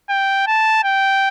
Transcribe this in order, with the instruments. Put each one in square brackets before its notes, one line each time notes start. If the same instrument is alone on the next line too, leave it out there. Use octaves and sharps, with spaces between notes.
[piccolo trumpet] G5
A5
G5